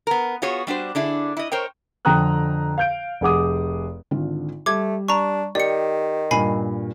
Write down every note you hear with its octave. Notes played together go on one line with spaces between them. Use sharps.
B3 A#4
B3 F4 F#4 G#4 C#5
G3 D4 F#4 C5
D3 D4 E4 G#4
E4 D#5
A#4 C5 C#5 G5
F2 D3 G5 A#5 D#6 F#6
F5 G6 D7
F1 G#4 F#5 D6 D#6
G#1 D3 F4
G3 A3 D6 G#6
D4 A#5 C#6
D#3 G4 D5 C#7
G2 A#2 G#5 B5 C7